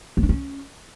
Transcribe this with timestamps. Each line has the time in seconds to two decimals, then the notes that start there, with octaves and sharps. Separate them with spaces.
0.17 B3
0.23 D4
0.29 C#4